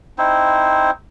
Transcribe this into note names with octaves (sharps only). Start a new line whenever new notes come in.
C4 D#4 E4 C5